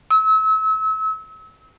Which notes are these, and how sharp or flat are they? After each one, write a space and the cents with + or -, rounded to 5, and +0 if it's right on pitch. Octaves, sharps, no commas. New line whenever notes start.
E6 -35